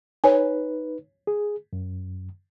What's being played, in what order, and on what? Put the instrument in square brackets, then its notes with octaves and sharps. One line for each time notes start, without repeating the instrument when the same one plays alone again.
[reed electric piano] D#4 B4 [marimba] C#5 G#5
[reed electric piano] G#4
F#2